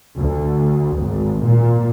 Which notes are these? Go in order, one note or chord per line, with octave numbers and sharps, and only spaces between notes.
D2
G#1
A#2